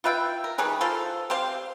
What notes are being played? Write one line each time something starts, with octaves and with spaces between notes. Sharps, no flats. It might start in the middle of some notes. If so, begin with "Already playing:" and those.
F4 B4 E5 G5
A#4
D#3 G3 G#4 B4
F4 A4 C5 F5
C4 G4 C5 F5